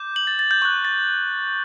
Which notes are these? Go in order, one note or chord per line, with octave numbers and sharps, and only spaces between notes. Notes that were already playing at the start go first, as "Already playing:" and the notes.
Already playing: D6 G6
F#7
A6
A6
G6
C#6 F#6 G6
A6